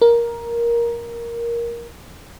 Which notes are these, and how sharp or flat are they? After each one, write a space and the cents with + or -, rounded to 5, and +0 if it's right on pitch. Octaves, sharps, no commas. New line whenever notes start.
A#4 +10